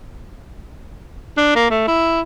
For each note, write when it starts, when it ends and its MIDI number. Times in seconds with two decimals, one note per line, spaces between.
1.37 1.51 62
1.56 1.67 58
1.71 1.87 57
1.88 2.21 64